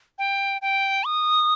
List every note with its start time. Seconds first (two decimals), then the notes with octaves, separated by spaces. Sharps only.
0.18 G5
0.62 G5
1.05 D#6